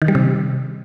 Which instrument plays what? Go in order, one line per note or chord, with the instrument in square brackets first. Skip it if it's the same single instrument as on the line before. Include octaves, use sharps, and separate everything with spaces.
[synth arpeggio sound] D#3
G3
C3